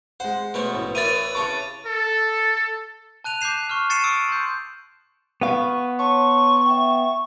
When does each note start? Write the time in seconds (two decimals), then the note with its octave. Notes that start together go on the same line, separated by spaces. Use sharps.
0.20 G#3 C5 F#5
0.54 B2 A3 C#4 B4 C5 D#6
0.75 A1
0.95 E4 A#4 B4 C#5 D5 G#5 A6 D#7
1.35 C#3 C#4 A5 C#6 D6
1.86 A4
3.24 A5 F#6 D#7 F7
3.41 D6 F#6 G6 C7 E7
3.69 C#6 F6
3.90 C#6 A6 C7 C#7 D#7 E7
4.04 D#6 E6 C#7 D7 E7
4.29 C6 G6
5.41 B3 F5 C#6
5.99 C#5 A5 C6 C#6
6.66 E5 G5